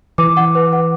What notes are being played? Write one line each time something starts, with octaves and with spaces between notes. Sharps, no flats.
E3 D6
F#5
B4
F#5